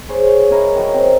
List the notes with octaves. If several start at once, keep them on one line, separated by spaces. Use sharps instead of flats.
G#4 C5 C#5
E4 A#4 D#5
D#3 F#3
C4